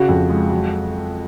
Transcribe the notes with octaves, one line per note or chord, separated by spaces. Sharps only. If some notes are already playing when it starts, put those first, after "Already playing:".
Already playing: C#3 F#4
F2
G#3
F#3